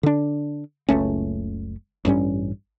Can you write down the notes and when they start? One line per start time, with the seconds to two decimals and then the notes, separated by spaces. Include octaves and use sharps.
0.03 D3 D4
0.89 F#1 C#2 A3 C#4
2.05 A1 G2 G3 C#4